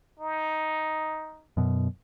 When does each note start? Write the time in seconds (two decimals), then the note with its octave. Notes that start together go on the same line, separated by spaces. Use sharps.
0.19 D#4
1.57 F#2 B2